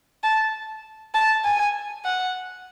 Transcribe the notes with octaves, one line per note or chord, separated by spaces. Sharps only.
A5
A5
G#5
F#5